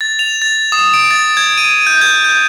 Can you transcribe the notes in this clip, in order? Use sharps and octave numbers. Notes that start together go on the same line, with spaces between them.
A6
F7
A6
D#6
D7
A6
G#6
D#7
G6
G#6
G6